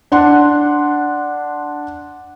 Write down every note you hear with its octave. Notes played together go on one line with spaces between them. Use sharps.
D4 F#5 C6